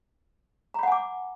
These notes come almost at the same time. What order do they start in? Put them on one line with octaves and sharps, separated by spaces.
A#5 B5 F#5 G#5 D6